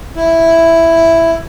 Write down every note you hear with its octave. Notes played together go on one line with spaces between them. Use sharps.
E4